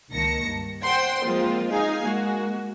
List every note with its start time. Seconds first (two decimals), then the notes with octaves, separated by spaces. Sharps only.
0.11 C#2 D#3 A#3 A5 A#6 C#7
0.45 G2
0.85 C5 F#5 G5 C6
1.25 F3 G#3 A#3 C4 F4
1.71 D#4 G#4 F5 G#5
2.04 G#3 A#3 F#4